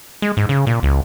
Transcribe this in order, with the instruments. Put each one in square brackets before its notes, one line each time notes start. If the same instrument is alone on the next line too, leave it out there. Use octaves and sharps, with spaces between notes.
[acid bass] G#3
G#2
C#3
A#2
C#2